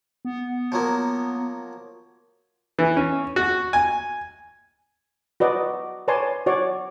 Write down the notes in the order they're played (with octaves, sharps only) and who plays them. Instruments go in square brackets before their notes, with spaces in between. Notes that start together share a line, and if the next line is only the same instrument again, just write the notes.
[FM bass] B3
[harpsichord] F3 F#3 A#3
[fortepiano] E3
C#4
F#4
G#5
[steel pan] F#4 B4 D5 D#5
B4 C#5 D5 G#5 A5 C6
F#4 C#5 D5